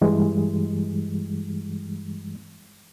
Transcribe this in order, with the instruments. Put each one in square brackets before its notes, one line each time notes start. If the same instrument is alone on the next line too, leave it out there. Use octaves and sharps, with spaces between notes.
[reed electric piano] G2 E3 G3 G#3